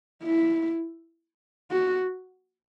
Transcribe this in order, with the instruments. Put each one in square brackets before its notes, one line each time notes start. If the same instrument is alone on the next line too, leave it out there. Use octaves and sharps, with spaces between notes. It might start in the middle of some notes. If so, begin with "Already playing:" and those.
[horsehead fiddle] E4
F#4